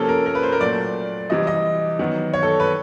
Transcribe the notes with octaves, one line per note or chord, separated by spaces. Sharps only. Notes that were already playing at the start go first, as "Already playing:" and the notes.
Already playing: C3 F3 A#3 C#4 A4
A#4
A#4
B4
C5
A#4
A#2 F#3 A3 D5
C3 E3 G3 D#5
D#5
D#3 F#3 B3
C#5
A4
B4